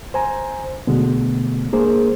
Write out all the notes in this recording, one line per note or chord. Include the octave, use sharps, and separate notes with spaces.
C5 G#5 A#5
B2 D3 G#3 A3 B3
G#3 A#3 D4 G#4 A#4 C5